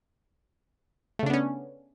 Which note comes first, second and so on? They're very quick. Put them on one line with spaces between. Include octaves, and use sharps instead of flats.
A3 C#3 D4 B3 C#4